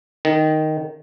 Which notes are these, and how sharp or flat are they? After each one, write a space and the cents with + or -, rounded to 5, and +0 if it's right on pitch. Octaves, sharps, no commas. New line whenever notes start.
D#3 +0